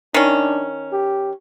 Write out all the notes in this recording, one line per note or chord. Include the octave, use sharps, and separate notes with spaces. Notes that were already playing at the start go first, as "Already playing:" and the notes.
D#3 C#4 D4
G4